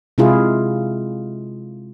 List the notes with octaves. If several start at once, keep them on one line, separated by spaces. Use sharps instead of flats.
C3 G#3 E4 F4 G#4